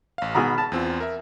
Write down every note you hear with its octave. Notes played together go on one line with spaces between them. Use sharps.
A1 F5
G#1 B2 G#4 A#5 B5 F6
A5
E2 C4 F4
A#4 E5